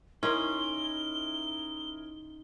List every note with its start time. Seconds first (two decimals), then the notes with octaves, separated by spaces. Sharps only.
0.23 C#4 D#4 E4 G#4 A#4 C6 G7